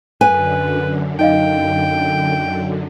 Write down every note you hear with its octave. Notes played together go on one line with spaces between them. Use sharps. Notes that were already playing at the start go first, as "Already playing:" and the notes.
F#2 D3 B4 G#5
D#4 D#5 F5 G5